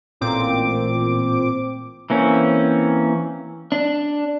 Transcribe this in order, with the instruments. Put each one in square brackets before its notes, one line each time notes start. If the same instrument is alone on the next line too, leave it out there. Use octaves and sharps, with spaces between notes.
[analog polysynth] A1 A#2 C4 D6
[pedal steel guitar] E3 A#3 C4 C#4
[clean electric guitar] D4